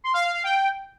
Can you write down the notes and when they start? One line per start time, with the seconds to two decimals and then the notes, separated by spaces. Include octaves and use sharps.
0.04 C6
0.14 F5
0.24 F5
0.34 F5
0.44 G5